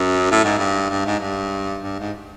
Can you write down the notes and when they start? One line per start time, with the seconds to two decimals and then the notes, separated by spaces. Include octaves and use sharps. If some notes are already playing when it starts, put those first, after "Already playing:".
Already playing: F#2
0.31 A2
0.44 G#2
0.58 G2
0.90 G2
1.05 G#2
1.20 G2
1.83 G2
1.99 G#2